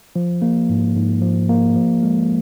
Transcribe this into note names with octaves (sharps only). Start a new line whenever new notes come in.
F3
A#3
G#2
G#2
F3
A#3
F3
G#3